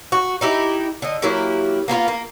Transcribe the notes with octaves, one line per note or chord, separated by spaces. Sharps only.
F#4
D#4 E4 G4
D3 D#5
F#3 A#3 E4 G4
A#3 B3 E4 F4
A#3